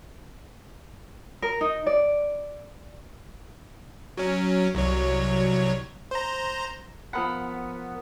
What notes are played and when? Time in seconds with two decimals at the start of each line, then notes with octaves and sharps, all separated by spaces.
1.42 A#4
1.61 D#4
1.86 D5
4.17 F#3 C#4
4.75 C2 F#3 C#5
6.11 C5 A#5
7.13 F3 B3 A#4 F#5 B5